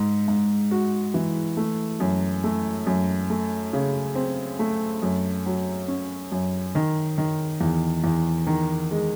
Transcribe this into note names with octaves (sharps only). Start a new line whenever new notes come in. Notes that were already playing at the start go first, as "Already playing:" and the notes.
Already playing: G#2
G#2
F#4
E3
A3
F#2
A3
F#2
A3
C#3
C4
A3
F#2
F#3
C#4
F#2
D#3
D#3
E2
E2
D#3
G#3